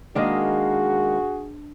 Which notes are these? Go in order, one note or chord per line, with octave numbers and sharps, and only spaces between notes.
D#3 G#3 A#3 D4 F#4 G#4 D#5